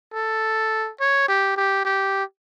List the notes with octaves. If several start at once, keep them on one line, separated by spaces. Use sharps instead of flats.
A4
C#5
G4
G4
G4